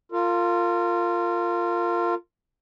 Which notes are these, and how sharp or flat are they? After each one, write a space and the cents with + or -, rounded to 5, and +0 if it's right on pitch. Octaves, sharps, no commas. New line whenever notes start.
F4 +0 A#4 -35